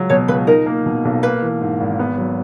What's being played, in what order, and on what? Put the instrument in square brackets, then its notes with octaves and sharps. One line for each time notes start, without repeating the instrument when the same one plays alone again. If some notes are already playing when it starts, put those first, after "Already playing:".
Already playing: [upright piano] C#2 F#3
[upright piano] B2 [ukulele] C#5
[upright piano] C#2 [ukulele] B4
[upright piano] D#4 [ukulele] A#4
[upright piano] A#3
B2
B1
[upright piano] A#3 [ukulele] B4
[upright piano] E3
G#2
G#1
B3
F#3